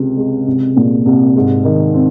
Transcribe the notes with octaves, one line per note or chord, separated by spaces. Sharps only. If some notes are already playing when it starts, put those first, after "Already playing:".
Already playing: C#2 C3
G#3
C2
A#2
C2
G#2
D#3
C4